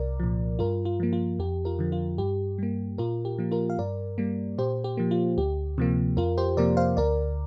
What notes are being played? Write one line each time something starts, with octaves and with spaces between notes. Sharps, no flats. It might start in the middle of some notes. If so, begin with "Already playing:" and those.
Already playing: C2 A#4 D5
A#2 F3
G2 F4 A#4
F4
F3 A#3
F4
F2 G4
F4 A#4
D3 F3
F4
G2 G4
G3 A#3
A#2 F4 A#4
G4
F3 A#3
F4 A#4
F5
G2 A#4 D5
G3 A#3
A#2 G4 C5
G4
F3 A#3
F4
D2 G4
C3 F3 A#3
F2 F4 A#4
G4 C5
C3 F3 A#3 A#4 D5
C5 F5
D2 A#4 D5